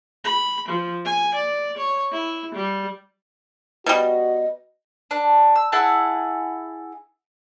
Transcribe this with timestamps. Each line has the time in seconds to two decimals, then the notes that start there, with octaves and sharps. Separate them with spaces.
0.24 B5
0.68 F3
1.05 G#5
1.35 D5
1.77 C#5
2.12 E4
2.55 G3
3.86 B2 G3 F#4 D#5
5.11 D4
5.56 E6
5.72 E4 G#4 F#5 A5